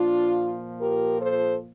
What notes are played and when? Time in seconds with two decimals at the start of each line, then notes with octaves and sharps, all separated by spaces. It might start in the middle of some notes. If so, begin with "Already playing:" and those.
Already playing: A#2 F3 D4 F4
0.81 G4 A#4
1.21 A4 C5